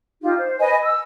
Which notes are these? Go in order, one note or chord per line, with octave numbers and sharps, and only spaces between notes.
D#4 F4 G4
C5
B4 D#5 G#5
E6